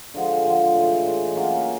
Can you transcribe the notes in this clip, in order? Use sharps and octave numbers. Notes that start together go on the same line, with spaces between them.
D3 F3 G#3
D3 F3 G#3
A2 E3 G#3
A2 E3 G#3
F#3 A#3 C#4 F4